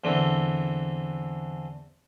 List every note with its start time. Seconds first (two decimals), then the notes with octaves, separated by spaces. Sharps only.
0.04 E2 D3 E3 C4